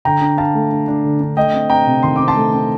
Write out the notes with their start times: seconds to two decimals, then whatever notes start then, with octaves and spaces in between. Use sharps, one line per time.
0.05 D3 G5 A#5
0.21 D4
0.37 D4 F5 A5
0.54 A3
0.71 D4
0.88 D4
1.04 D3
1.20 D4
1.37 A3 D#5 G5
1.53 C4
1.70 C4 G5 A#5
1.87 C3
2.03 D#3 C6
2.16 C4 D6
2.28 A5 C6
2.35 A3
2.53 C4